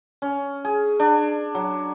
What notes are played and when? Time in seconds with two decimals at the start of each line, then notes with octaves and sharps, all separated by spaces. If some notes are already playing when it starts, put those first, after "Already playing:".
0.22 C#4
0.65 G#4
1.00 D4
1.55 F#3